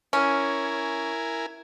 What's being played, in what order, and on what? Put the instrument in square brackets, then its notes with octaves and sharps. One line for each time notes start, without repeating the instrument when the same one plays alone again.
[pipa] C#4 [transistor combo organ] E4 A#4 G#5